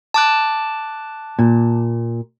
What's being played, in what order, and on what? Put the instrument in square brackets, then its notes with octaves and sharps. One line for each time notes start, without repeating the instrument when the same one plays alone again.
[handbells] A5 D6 F#6
[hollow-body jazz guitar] A#2